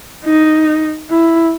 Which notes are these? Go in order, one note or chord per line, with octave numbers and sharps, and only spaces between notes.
D#4
E4